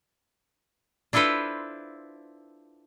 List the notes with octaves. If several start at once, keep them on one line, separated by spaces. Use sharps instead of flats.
D4 E4 F4 A4 B4 C5